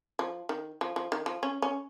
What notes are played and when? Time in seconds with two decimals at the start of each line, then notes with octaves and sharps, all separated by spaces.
0.19 F3
0.49 D#3
0.81 F3
0.96 F3
1.12 D#3
1.26 F3
1.43 C#4
1.62 C#4